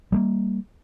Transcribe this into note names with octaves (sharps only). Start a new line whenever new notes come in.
G3 A3 A#3